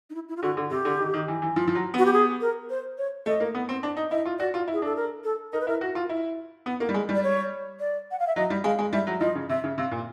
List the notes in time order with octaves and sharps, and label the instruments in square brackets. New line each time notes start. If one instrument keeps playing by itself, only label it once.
[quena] D#4
E4
E4
F4
[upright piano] D3 [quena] F#4
[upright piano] D3
[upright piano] C3 [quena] G4
[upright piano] D3
D#3
D#3
E3
E3
F3
F3
F#3
[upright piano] B3 [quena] F#4
[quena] G4
G#4
A#4
C5
C#5
[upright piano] A3 [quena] D#5
[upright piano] A#3
B3
C4
D4
D#4
[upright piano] E4 [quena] D#5
[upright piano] F4
[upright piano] F#4 [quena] D5
[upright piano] F4
E4
[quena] G#4
[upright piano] D4 [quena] A4
[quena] A#4
A4
[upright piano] D#4 [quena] A#4
[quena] B4
[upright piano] E4 [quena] A#4
[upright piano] F#4
F4
E4
B3
A#3
G3
G#3
G3
[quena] D5
C#5
D5
F#5
F5
E5
[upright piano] F#3 [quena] D#5
[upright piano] G3
[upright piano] G#3 [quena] F5
[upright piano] G#3
[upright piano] G3 [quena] E5
[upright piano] F#3
[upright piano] F3 [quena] D#5
[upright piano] C#3
[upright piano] C3 [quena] E5
[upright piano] C#3
[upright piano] C3 [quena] F5
[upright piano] A#2